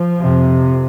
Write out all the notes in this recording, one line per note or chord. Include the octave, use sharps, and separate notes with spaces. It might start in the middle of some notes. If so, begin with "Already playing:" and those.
Already playing: F3
F2 C3